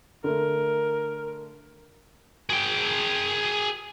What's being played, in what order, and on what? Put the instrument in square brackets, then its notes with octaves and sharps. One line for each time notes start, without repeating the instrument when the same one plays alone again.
[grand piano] D3 A3 [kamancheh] A#4
[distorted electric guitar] G#4 G5